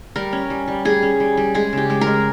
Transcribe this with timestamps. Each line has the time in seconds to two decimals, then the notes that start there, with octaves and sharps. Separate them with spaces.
0.16 G3 A#4
0.33 C#4
0.50 G3
0.68 G3
0.85 G3 G#4
1.03 C#4
1.20 G3
1.37 G3
1.55 G#3 G#4
1.73 C#3 G4
1.90 G#3
2.01 A#4
2.07 G#3